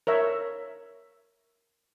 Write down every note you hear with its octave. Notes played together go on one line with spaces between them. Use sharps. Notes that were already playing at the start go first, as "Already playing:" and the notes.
A#4 C#5 E5